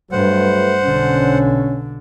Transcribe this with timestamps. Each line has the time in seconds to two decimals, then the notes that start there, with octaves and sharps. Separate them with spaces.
0.12 G2 F#3 A3 B4 C5 F#5
0.84 B1 D3 C#4